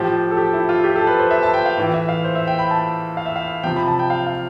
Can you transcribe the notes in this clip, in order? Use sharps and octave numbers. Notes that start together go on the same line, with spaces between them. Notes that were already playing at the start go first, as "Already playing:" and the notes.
Already playing: A2 F3 G4
A4
G4
E4
F4
G4
A4
B4
C5
E5
A5
G5
F5
A2 E3
E5
F5
C5
E5
G5
B5
A5
F5
E5
F5
C3 F3 G5
B5
A5
G5
F5
F5